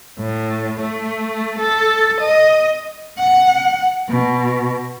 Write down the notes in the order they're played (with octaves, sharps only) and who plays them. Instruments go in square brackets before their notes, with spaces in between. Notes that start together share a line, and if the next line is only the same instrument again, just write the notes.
[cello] A2
A3
A4
D#5
F#5
B2